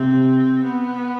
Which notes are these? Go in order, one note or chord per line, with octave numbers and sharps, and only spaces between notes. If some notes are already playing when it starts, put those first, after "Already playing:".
Already playing: C3 C4
B3